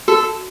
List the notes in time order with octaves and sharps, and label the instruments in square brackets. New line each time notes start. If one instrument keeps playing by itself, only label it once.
[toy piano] F#4 [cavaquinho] A4